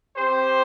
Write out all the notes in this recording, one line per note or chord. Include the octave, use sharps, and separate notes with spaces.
C4 G4 C5